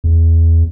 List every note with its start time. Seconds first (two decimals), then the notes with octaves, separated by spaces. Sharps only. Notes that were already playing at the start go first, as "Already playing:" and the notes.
0.04 E2